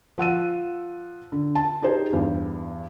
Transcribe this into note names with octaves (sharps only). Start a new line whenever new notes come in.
F3 F#5 E6 D#7
D3
A5
D#4 G4 G#4 C5
E2 G2